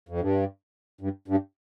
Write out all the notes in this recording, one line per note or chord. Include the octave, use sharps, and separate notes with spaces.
F2
G2
G2
G2